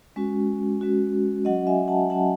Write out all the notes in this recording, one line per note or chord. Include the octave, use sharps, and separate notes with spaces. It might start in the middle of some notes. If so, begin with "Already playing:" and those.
G#3 C#4 F#4
G#3 C#4 F#4
F#3 C#4 F#4 D#5 F#5
E5 G#5
F#5 A5
F#3 C#4 F#4 F#5 A5